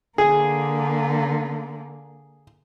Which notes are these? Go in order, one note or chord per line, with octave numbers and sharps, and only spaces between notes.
D3 A#3 G#4